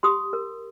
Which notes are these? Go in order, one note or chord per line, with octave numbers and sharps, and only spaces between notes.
G4 C6 D#6
A#4